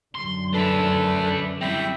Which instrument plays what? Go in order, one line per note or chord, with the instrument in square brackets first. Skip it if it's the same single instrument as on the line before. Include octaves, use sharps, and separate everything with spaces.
[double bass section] F#2 D3 [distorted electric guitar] C6
[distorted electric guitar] D4 E5 [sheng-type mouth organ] A4 B4
[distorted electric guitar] C4 E4 [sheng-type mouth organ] E5 G5